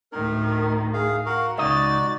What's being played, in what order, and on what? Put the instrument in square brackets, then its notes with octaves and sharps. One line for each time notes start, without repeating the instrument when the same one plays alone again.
[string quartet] D2 A2 D#3 [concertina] A#4
[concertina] G#4 F5
[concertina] F#4 A#4 F5 [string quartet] F#5
[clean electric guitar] C#2 D#4 D#5 [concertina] F#4 D5 [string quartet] A6